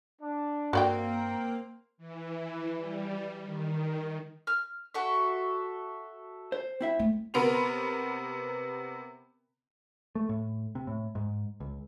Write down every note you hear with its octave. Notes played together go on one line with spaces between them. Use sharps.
D4
G2 A#3 C4 F#4 D5 G5
E3
G3
D#3
F6
F#4 A4 E5
C5
C4 E4 E5
A3
C3 B3 A#4 B5 C6 F7
A3
A2
C3
A2
G#2
C#2